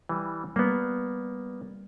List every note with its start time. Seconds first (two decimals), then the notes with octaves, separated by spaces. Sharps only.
0.09 E3 G3
0.56 G3 A#3 B3